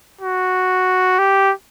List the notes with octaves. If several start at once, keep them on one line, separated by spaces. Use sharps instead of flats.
F#4
G4